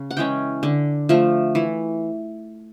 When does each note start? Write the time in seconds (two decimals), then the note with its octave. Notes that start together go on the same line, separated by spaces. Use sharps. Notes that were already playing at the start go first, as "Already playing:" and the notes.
Already playing: C#3
0.11 F#5
0.17 E3 G#3 C#4 G5
0.63 D3
1.09 F3 A3
1.55 E3